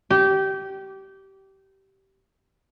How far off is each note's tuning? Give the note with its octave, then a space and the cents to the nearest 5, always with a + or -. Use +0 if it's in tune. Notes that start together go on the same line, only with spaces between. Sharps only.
G4 -20